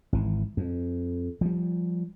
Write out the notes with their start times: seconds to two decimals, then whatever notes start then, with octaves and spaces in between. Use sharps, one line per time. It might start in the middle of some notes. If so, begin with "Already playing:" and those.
0.13 G#1 E3
0.57 F2
1.41 F3 G3